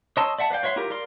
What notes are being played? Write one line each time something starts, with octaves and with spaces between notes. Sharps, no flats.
C#5 D#5 A5 C6 E6
D5 E5 F#5 A5
B4 D5 F5 G5
F#4 C#5 E5 C6
E4 F4 G4 A#4
A#4 D5 F5 C6